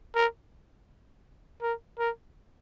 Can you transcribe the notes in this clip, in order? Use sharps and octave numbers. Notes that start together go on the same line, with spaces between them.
A#4
A#4
A#4